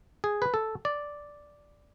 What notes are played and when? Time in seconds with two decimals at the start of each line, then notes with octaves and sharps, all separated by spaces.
0.24 G#4
0.42 B4
0.54 A4
0.85 D5